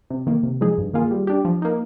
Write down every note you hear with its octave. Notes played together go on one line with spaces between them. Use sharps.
C3
D#3 A#3
C3
F3 G#3 D#4 G#4
G2
D#3 A#3 F4 G#4
G3
D4 G4
F3
A#3 D#4